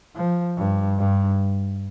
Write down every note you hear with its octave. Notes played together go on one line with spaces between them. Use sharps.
F3
G2
G2